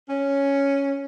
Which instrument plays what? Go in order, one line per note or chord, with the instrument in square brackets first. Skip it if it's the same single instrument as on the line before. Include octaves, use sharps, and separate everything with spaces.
[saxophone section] C#4